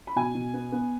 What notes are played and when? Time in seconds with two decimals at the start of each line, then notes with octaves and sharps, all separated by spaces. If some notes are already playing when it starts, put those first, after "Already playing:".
0.07 B5
0.16 B2 G#5
0.35 B2
0.54 B3
0.72 B3